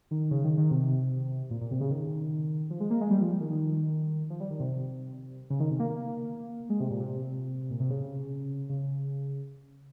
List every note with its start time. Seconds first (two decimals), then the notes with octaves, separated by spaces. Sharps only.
0.11 D#3
0.31 C#3
0.44 D#3
0.58 D#3
0.71 C3
1.50 A#2
1.61 A#2
1.71 C3
1.80 C#3
1.90 D#3
2.70 F3
2.80 G#3
2.90 A#3
3.01 G#3
3.10 G3
3.21 F3
3.40 D#3
3.51 D#3
4.30 F3
4.40 G3
4.50 D#3
4.60 C3
5.50 C#3
5.60 D#3
5.70 C3
5.80 A#3
5.90 A#3
6.70 G#3
6.80 C3
6.90 A#2
7.00 C3
7.70 A#2
7.80 C3
7.90 C#3
8.69 C#3